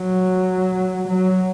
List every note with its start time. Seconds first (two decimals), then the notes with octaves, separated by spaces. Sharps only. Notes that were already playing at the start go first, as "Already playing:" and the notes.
Already playing: F#3
1.07 F#3